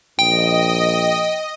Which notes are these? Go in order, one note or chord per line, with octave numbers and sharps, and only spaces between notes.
A#1 D#5 G5